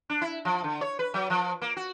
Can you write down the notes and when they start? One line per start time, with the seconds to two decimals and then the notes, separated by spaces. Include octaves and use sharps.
0.10 D4
0.21 E4
0.45 F3
0.64 D3
0.81 C#5
0.99 B4
1.14 F#3
1.30 F3
1.62 A#3
1.76 F#4